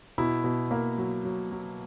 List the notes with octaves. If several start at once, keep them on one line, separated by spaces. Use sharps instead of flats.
B2 E4
B2
A#3
F#3
F#3
F#3